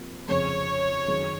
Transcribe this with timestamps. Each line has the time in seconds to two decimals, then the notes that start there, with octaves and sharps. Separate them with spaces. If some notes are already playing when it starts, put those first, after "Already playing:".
Already playing: C3 F3 A#3
0.28 F2 C#3 G#3 C#5
1.08 F#2 D#3 G#3